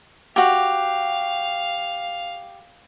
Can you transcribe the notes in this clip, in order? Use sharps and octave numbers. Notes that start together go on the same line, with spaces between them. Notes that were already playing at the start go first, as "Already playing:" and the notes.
F#4 G4 F5